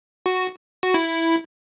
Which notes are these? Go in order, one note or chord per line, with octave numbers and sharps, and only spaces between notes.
F#4
F#4
E4